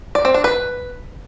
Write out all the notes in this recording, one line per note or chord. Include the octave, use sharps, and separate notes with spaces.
D5
C4
D4
B4